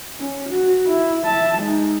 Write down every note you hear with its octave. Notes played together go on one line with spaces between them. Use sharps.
C#4
F#4
E4
E5 A5
G#3 D#4